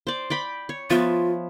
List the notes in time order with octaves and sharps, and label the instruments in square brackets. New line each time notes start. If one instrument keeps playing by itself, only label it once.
[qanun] C5 D5
D5 G5 B5
C#5
[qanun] F3 B3 E5 [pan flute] F4